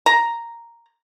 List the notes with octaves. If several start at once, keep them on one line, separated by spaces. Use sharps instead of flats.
A#5